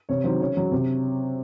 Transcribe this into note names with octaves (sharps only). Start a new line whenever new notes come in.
C3 C#5
D#3 F#3 C5
C#3 C#5
F#3
C3